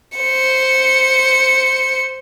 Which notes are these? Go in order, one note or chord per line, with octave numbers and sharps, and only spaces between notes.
C5 C#7